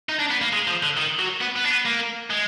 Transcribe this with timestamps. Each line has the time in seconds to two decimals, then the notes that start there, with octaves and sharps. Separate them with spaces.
0.09 D#4
0.19 D4
0.31 B3
0.42 A#3
0.53 G#3
0.68 F3
0.83 D3
0.97 D#3
1.19 F#3
1.41 B3
1.56 B3
1.65 D4
1.71 B3
1.86 A#3
2.30 G#3